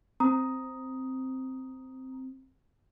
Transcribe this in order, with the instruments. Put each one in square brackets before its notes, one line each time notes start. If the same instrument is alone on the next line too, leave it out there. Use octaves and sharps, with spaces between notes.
[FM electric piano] C4 [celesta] A#5 D#6